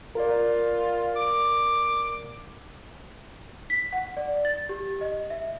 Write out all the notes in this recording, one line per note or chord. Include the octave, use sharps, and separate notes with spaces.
F4 A#4 D5
D6
B6
F#5
D5
A6
G4
D#5
E5